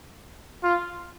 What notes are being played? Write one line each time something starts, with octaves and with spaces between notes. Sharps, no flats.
F4